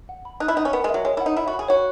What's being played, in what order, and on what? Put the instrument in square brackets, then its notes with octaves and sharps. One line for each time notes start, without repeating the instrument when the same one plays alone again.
[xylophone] F#5
B5
[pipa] D#4 [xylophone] F#6
[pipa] E4
[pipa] D#4 [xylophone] F#5
[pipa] C#4
[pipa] B3 [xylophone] A#4
[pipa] G#3
[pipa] F#3 [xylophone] E5
[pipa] G#3 [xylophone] C#5
[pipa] E4
[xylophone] F#5
[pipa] D#4
[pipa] E4 [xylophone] E5
[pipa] F#4
[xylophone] B5
[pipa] G#4
[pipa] F#4 [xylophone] C#5